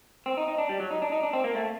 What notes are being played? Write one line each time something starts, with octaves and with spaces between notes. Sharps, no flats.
C4
D#4
D#4
D4
G3
F#3
D#4
D4
D#4
D4
C4
A#3
A3